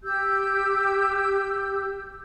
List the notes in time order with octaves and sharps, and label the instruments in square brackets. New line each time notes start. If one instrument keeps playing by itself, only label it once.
[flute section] G4 E6 G6